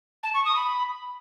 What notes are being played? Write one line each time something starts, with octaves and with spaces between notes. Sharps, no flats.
A5
C#6
D#6
B5